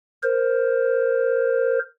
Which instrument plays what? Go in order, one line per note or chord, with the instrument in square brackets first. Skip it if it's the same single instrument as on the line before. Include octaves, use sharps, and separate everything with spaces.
[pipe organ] A#4 C5